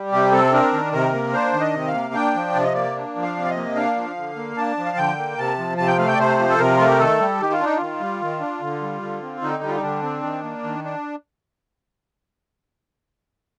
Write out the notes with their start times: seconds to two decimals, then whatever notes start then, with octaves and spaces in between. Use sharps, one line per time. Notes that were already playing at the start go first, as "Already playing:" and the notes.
Already playing: G3
0.12 C3 G4
0.32 C4 A4
0.53 D4 A#4
0.73 D#3
0.93 C3 A#4
1.13 A#3
1.33 D4 C5
1.53 D#3
1.61 D#5
1.74 C3
1.88 F5
1.94 A#3
2.14 D4 G5
2.35 F3
2.55 C3 D5
2.64 D#5
2.74 A#3 D5
2.96 D4
3.16 F3
3.22 F5
3.36 C3
3.44 D5
3.49 D#5
3.56 A#3
3.76 D4 F5
3.96 F3
4.17 D3
4.36 A#3
4.57 D4 A5
4.78 F3
4.86 F5
4.97 D3 G5
5.18 A#3
5.38 C3 A5
5.58 F3
5.78 C3 A5
5.88 G5
5.98 A3 F5
6.07 G5
6.14 D5
6.18 C3 C5
6.39 F3
6.49 A4
6.59 C3 A#4
6.77 A3 F4
6.87 G4
6.99 D#3 A4
7.19 G3
7.41 D#3 G4
7.53 F4
7.61 D4 D#4
7.77 D#3 F4
8.00 G3
8.21 D#3
8.40 D4
8.61 D3
8.81 G3
9.02 D3
9.22 C4
9.42 D3 D#4
9.63 G3
9.69 F4
9.75 D#4
9.82 D3 D4
10.03 C4
10.23 D#3
10.43 A#3
10.64 D#3
10.84 D4